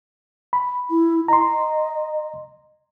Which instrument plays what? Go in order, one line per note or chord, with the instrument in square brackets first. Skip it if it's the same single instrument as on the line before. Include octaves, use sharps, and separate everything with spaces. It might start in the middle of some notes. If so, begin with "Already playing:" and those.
[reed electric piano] B5
[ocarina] E4
[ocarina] D#5 [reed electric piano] A#5 C6